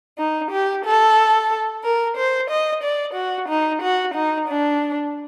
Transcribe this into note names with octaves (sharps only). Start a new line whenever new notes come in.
D#4
G4
A4
A#4
C5
D#5
D5
F#4
D#4
F#4
D#4
D4